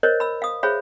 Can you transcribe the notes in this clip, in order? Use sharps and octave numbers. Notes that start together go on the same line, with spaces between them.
A#4 C5 C#5 D#5
B5 E6
F5 D#6
G#4 C5 C#5 E5 F5 B5